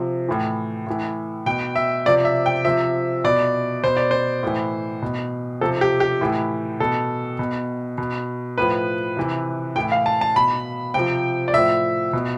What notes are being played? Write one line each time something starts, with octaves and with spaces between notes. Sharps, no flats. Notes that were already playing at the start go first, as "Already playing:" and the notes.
Already playing: C3 F3
A2 E3
A2 E3
B2 G5
E5
C3 F3 D5
E5
G5
C3 F3 E5
B2 D5
B2 C5
D5
C5
A2 E3
B2
C3 F3 A4
G4
G4
A2 E3
B2 A4
B2
B2
A2 F3 B4
C3 E3
A2 E3 G5
F5
A5
A5
B2 B5
C3 F3 G5
D5
A2 F3 E5
B2